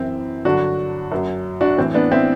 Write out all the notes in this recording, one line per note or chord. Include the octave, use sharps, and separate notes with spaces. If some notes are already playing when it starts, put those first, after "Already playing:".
Already playing: F#2 E3 C4 E4
G2 D3 F#3 D4 F#4
F#2 F#3
D4 F#4
A2 E3 C4
B3 D4
C4 E4